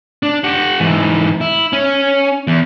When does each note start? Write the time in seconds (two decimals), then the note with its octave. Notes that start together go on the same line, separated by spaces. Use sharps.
0.23 D4
0.44 G4 F#5
0.80 G#2 E3
1.41 E4
1.73 C#4
2.47 E2